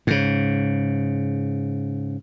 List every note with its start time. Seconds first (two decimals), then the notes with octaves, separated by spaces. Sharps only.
0.07 G#2 C#3